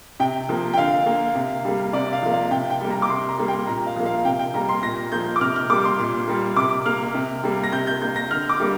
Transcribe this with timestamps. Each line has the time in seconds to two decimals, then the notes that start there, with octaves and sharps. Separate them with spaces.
0.20 C3 G5
0.49 F3 A#3
0.74 G5
0.77 D3 F5
1.06 A#3
1.35 C3
1.65 G3 A#3
1.93 C3 D5
2.13 F5
2.22 F3 A#3
2.32 F5
2.51 C3 G5
2.70 G5
2.81 G3 A#3
2.90 A#5
3.02 D6
3.09 C3 C6
3.29 A#5
3.38 G3 A#3
3.48 G5
3.67 A#2 A#5
3.87 F5
3.96 F3 A#3
4.06 F5
4.25 C3 G5
4.39 G5
4.54 G3 A#3 A#5
4.69 C6
4.82 A#2 A#6
5.12 F3 A#3 G6
5.36 D6
5.41 C3 F6
5.56 F6
5.70 G3 A#3 D6
5.85 C6
5.99 A#2
6.28 G3 A#3
6.56 C3 D6
6.86 A#3 F6
7.15 C3
7.44 G3 A#3
7.63 A#6
7.72 C3 G6
7.87 G6
8.02 A#3 G6
8.16 A#6
8.31 D3 F6
8.49 D6
8.60 G3 A#3